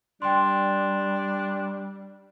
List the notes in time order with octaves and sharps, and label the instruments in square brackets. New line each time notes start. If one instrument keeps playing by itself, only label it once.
[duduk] G3 [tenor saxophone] D4 [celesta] G5 C6